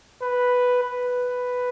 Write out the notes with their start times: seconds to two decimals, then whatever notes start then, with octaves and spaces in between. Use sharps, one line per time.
0.22 B4
0.83 B4